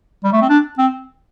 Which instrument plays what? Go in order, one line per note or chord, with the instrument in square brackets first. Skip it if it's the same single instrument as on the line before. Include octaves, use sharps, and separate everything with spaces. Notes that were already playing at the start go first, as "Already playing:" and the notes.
[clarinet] G3
A3
C4
D4
C4